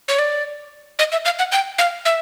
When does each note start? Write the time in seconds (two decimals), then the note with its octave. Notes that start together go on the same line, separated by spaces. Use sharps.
0.08 C#5
0.19 D5
0.99 D#5
1.12 E5
1.25 F5
1.39 F#5
1.52 G5
1.78 F5
2.05 E5